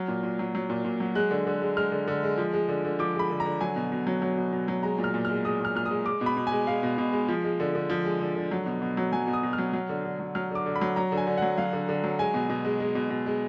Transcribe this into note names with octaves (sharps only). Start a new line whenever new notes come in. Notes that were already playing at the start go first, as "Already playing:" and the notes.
Already playing: F#3 F6
A#2
A#2
F#3
F#3
A#2
A#2
F#3
G#3 F#6
D3
D3
G#3
G#3 F6
D3
D3
G#3
F3
G#3
D3
D3
F3 D6
G#3 B5
D3
A#5
D3
F#3 G#5
B2
B2
F#3
F#3
B2
B2
F#3
G#3 A#5
A#2
F6
A#2
G#3 F6
G#3 D#6
A#2 F6
A#2 F6
D#6
G#3
G#3 D6
B2
B5
B2
G#5
G#3
G#3 F5
B2
B2
G#3
F3
G#3
D3
D3
F3
G#3
D3
D3
F#3
B2
B2
F#3
F#3 G#5
B2
D#6
B2
F6
F#3
F#3
D3
D3
F#3
F#3 F6
D3 D6
D3
B5
F#3
F#3 A#5
D3
G#5
D3
F#3 F#5
F#3 F5
D3
D3
F#3
G#3 G#5
B2
B2
G#3
G#3
B2
B2
G#3